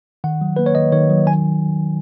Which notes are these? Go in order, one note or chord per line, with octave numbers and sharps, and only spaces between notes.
D#3 F#5
F#3
A#3 B4
C#5
D#3 D#5
D#3 C#5
F#3
D#3 G#5